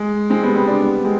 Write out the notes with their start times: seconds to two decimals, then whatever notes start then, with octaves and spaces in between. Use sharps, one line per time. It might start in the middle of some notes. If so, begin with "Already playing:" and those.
Already playing: G#3
0.30 G#3 C4
0.43 G3 B3
0.55 G3 B3
0.67 B3 D4
0.80 G3 B3
1.05 G#3 C4